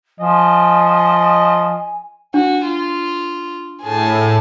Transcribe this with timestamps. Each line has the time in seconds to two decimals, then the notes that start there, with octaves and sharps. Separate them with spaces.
0.20 F3 D#5 G#5
2.34 D4 F#4
2.66 F4
3.83 A2 G#4 A5